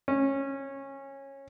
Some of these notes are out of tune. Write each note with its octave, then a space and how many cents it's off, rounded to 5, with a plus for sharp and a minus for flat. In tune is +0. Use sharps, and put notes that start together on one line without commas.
C#4 -15